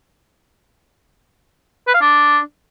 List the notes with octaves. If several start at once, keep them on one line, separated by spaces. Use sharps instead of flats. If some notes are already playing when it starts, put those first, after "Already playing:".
B4
F5
D4